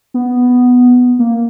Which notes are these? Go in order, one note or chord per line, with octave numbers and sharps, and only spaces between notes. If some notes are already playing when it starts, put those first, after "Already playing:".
B3
A#3